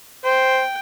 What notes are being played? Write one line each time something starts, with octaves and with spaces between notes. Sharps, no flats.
C5 G5